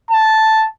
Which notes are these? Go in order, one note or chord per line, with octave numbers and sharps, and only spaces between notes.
A5